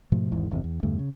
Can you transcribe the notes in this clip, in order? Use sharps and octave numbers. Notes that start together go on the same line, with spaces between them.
G#2 B2 F3 A3
G#1 E2 G#2 E3
G1 E2 C3
E2
E2 G2 D3 A3
C#3